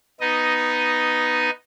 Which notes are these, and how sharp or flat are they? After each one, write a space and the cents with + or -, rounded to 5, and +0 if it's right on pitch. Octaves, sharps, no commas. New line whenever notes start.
B3 +5 D#4 +0 D#5 +0